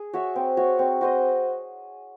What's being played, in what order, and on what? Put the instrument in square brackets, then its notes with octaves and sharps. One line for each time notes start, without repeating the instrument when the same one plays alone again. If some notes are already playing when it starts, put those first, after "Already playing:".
Already playing: [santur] G#4
F#4 C#5 E5
C4
F#4 C#5 E5
C4
F#4 C5 D#5